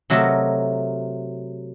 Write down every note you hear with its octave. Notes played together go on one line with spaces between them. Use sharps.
C3 F#3 A3 A#4 D#5 E5